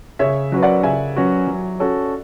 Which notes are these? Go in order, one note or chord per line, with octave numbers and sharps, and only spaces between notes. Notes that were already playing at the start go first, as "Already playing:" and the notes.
C#3 C#5 E5
F#3 C#4 F#4 B4
D5 F#5
C#3 E5 G#5
F#3 C#4 F#4 B4
F#3
C#4 F#4 A4 C#5